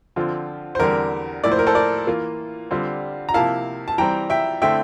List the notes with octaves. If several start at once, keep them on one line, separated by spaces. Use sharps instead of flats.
D3 F3 C4 F4
C5
E2 D3 G3 C4 A#4
A2 F3 A#3 E4 D5
C5
A#4
A4 C5
A#4 D5
E3 A#3 F4
D3 G3 C4 F4
A#5
C3 F3 A#3 E4 F5 A5
A5
E3 G3 C4 G5 A#5
E5 G5
D3 A3 C4 E4 E5 G5